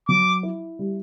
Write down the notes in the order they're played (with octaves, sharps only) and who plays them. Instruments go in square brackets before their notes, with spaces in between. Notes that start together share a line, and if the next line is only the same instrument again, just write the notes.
[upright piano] F#3 [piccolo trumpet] D6
[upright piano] E4
G3